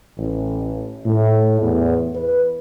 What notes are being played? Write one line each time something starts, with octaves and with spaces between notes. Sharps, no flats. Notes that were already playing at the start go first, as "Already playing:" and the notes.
A1
A2
E2
B4